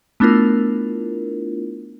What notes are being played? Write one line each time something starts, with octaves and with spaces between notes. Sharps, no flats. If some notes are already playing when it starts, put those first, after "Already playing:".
A3 B3 D4 E4 F4 A#4